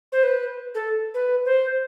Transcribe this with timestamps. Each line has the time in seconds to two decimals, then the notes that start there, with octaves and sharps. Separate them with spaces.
0.12 C5
0.23 B4
0.75 A4
1.14 B4
1.45 C5